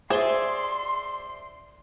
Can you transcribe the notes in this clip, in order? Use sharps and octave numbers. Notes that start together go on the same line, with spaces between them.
G#4 C5 D5 E5 C6 G7